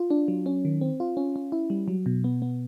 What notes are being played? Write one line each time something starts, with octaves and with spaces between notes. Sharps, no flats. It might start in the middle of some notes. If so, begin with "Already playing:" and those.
Already playing: F4
D4
F#3
C#4
D#3
C4
F4
C#4
C#4
E4
G3
F#3
B2
B3
B3